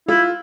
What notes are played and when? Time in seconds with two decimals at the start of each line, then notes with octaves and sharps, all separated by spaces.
0.08 E4 F4